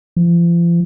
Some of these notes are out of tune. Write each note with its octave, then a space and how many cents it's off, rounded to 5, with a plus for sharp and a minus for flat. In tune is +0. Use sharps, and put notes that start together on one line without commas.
F3 -40